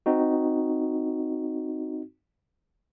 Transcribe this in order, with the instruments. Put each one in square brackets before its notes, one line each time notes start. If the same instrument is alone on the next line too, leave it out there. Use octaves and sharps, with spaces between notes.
[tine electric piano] C4 D#4 F#4